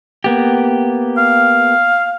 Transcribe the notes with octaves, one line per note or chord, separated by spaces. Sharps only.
A#3 B3 G4
F5